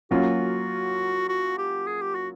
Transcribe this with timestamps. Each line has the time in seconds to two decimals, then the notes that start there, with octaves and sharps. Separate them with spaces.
0.11 F#3 A#3 C#4 F4 F#4
1.29 F#4
1.58 G4
1.87 G#4
2.01 G4
2.15 F#4